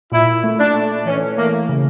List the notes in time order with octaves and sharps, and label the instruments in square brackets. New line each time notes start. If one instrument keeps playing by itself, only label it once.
[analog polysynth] A#2 [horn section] E4
[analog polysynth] A3
[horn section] D4
[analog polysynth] A3
[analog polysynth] E3 [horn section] C#4
[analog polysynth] A3 [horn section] A#3
[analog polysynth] C#3